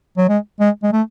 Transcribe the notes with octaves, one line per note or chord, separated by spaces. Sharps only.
F#3
G#3
G#3
G#3
A3